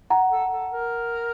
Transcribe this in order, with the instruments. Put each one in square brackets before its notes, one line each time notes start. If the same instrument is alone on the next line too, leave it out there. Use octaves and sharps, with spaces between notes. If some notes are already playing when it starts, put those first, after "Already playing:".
[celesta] F#5 A#5
[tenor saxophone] A4
A4
A#4